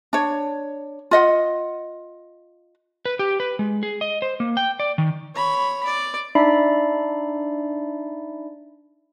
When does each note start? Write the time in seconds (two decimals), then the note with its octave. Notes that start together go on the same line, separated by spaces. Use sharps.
0.13 D4 C#5
1.11 F4 D#5 F#5
3.05 B4
3.19 G4
3.40 B4
3.59 G#3
3.83 G#4
4.01 D#5
4.22 C5
4.40 A#3
4.57 G5
4.80 D5
4.98 D#3
5.35 C#5 B5
5.85 D5
6.35 D4 D#4 D5 E5 B5 C7